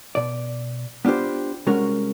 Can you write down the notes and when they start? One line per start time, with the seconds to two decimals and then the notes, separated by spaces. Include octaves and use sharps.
0.15 B2 D5
1.05 B3 D4 F4 G4 C5
1.66 C2 G#3 C#4 F#4 A#4